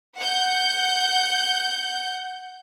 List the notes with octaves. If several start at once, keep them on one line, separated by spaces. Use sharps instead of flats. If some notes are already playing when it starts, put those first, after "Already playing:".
F#5 G6